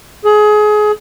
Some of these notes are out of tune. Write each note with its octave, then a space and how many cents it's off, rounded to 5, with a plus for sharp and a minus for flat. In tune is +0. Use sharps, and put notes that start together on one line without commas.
G#4 +25